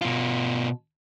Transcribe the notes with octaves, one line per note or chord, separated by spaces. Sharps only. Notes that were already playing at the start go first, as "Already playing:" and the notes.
B2 F4